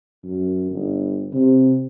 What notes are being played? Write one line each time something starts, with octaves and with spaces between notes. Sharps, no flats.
F#2
G1
C3